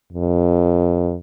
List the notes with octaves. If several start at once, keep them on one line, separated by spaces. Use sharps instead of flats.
F2